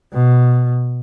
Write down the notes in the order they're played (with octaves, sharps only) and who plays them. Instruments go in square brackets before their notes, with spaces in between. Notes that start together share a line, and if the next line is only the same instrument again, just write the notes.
[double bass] B2